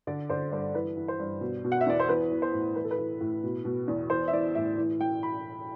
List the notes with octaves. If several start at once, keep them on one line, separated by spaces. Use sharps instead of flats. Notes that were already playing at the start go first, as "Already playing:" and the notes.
D3 D5
D3 C5
G2 C5
E3 B4
E3
C5
G2
B2
B2
F#5
E5
E2 D5
C5
E3 B4
E3
C5
A2
E3 B4
A4
B4
E3
A2
B2
B2
E2
E3 C5
E5
E3 D5
A2 E5
E3
E3 G5
B5